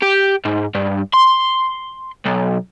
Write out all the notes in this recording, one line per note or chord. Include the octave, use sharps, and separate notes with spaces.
G4
G#2
G2
C6
B1